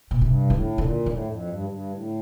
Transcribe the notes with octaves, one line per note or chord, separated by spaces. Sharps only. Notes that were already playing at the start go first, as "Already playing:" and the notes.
A#2
G2 C3
A2 D3
A#2 D3
A2 D3
F2
G2
G2
A2